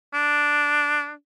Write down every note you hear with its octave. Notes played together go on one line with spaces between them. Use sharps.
D4